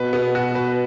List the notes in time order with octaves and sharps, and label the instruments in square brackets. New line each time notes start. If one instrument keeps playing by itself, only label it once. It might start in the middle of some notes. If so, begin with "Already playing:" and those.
Already playing: [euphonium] B2 [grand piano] B4
[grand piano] B3
F#4
B4